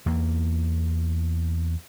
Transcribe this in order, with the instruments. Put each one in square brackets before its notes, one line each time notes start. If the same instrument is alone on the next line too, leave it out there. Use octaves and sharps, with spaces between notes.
[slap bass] E2 A#3